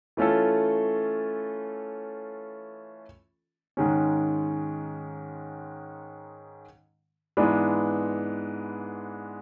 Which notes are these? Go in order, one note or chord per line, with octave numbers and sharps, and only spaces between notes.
E3 A3 C#4 F4 A4
G#2 D#3 G#3 C#4
G#2 E3 G#3 B3 D4